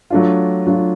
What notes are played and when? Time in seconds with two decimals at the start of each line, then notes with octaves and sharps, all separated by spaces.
0.10 F#3 A3 D4 F4
0.67 F#3 A3 D4 F4